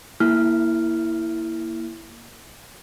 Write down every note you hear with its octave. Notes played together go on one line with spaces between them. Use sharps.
A#3 E4 F6